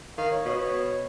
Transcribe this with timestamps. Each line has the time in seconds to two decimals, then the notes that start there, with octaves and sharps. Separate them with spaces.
0.18 D#3 F5
0.31 C#5
0.45 B2 C#5
0.60 C#5